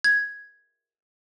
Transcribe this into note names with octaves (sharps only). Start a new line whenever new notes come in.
G#6